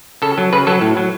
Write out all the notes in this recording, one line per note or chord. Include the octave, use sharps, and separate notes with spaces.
C#3 A4
F#3
C#3 B4
F#3 A4
A2
F#3